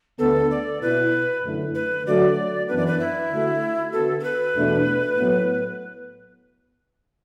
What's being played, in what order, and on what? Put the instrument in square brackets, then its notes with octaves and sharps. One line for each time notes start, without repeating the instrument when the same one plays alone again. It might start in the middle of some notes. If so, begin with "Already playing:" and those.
[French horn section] D2 D3 B3 [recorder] A4
[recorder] D5
[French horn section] B2 B3 E4 [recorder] B4
[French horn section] F#2 D3 A3 E4
[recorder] B4
[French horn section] D3 F#3 A3 F#4 [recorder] D5
[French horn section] F#2 E3 B3 D4 [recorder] B4
[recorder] D5
B4
E4
[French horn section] D3 A3 F#4
[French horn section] D3 B3 F#4 [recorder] A4
[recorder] A4
B4
[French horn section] E2 B2 A3 D4
A2 F#3 B3 F#4